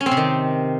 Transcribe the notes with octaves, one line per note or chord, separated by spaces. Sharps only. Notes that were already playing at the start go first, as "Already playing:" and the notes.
C#4
C4
C3
D#3